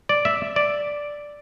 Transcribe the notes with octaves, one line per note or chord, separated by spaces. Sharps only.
D5
E5
D5